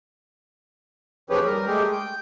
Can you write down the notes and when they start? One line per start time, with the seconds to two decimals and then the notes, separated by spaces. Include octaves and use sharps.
1.30 D#2 F3 C#4 G4 G#4 B4
1.46 G3 A#4
1.67 G#3 A3 G4 G#4
1.92 G5